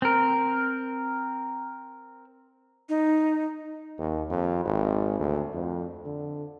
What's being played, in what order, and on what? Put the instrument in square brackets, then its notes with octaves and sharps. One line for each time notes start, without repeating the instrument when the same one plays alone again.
[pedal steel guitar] C4 A#4
[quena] D#4
[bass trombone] D#2
F2
G#1
D2
F2
D3